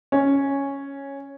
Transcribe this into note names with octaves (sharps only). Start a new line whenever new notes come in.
C#4